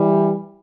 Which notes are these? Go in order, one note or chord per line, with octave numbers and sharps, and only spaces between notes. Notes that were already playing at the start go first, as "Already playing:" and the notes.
Already playing: E3 G3